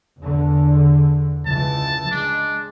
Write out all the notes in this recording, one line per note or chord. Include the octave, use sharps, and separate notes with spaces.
E2 D3
C#2 E3 A5
G#3 D4